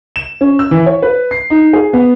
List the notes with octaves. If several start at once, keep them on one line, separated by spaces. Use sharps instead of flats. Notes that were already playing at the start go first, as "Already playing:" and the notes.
E7
C#4
E6
E3
C#5
B4
C7
D#4
G#4
B3